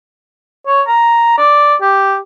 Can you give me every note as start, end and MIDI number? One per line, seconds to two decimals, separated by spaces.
0.67 0.82 73
0.88 1.35 82
1.38 1.75 74
1.82 2.18 67